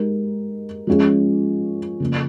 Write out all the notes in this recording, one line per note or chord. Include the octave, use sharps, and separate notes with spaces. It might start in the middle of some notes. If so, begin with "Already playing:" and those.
Already playing: G#3 D#4 G4 A#4
F3 G#3 C#4 F4 G#4
C#3 F3 A#3